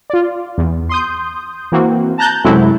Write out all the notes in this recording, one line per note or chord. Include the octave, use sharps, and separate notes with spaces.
F4 D5
E2
C6 D#6 G6
E3 A#3 C4 F#4
A5 A#5 F#6 G6 A6
F#2 C3 F#3 G#3 A3 E4